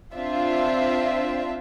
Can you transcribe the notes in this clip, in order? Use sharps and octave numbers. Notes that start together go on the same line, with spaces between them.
C4 D4 F4 E5